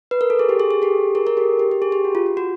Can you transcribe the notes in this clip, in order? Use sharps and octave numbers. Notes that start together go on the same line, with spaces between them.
B4
A#4
A4
G#4
G4
G#4
G#4
G4 A4
G#4 A#4
G#4 A#4
G4 A4
G4
G4
G#4
G4
F#4
F4
F4
F#4